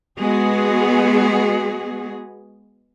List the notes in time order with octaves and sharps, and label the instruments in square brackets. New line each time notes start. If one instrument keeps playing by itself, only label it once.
[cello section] G#3 B3 F#4 G#4